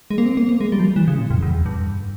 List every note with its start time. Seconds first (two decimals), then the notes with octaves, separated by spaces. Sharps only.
0.11 G#3
0.18 A#3
0.26 C4
0.37 A#3
0.49 A#3
0.61 G#3
0.72 G3
0.80 F3
0.84 G3
0.96 E3
1.08 C#3
1.19 A#2
1.30 F2
1.43 E2
1.53 F2
1.66 G2